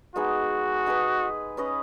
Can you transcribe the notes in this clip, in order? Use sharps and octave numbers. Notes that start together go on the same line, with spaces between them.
G#3 B3 D#4 F#4 G#4
D#4 G#4 B4
C#4 B4 D#5